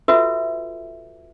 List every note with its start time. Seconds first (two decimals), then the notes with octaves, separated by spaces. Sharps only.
0.08 F4 F#4 A4 B4 E5